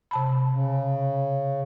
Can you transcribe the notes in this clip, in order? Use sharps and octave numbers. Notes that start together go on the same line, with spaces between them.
C3 A5 B5
C#3